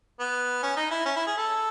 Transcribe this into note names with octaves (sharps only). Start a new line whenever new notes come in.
B3
C#4
D#4
E4
C#4
E4
G#4
A4